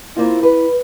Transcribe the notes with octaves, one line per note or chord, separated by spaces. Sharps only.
A#3 C4 E4 F4
B4